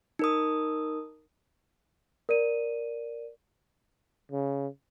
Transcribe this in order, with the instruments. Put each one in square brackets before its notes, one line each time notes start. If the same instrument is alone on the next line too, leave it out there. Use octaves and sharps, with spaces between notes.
[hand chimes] D#4 A#4 D#6
[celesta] A#4 D5 D#7
[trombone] C#3